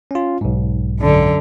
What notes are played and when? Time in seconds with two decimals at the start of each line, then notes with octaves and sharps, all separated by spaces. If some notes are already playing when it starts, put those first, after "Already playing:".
0.11 C#4 F4
0.41 B1 G#2
0.99 F#2 D3